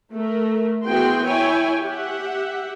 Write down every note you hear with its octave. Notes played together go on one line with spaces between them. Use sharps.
A3 A#4
E3 B3 F#4 G#4 G5 C6
E4 C#5 G5 G#5
G4 E5 F#5